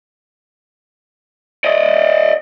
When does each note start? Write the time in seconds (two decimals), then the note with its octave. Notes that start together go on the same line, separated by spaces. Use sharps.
1.64 D5 D#5